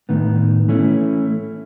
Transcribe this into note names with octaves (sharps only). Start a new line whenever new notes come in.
A2 D#3 B3
E3 A3 C#4 E4